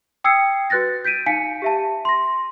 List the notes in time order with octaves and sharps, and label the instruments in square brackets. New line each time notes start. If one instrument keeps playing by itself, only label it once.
[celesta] G5 D#6 E6 G#6 C7 C#7
F#4 B4 F#6 A6 A#6
G6 B6 D7 D#7
D#4 F5 G#5 B6 C#7
G4 E5 A5
C6 A#6